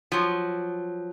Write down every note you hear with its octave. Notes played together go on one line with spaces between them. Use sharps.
F3 F#3